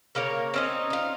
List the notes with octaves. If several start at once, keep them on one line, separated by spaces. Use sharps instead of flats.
C#3 A#3 A#4 C#5
C4 C#4 D#4
D#4 F4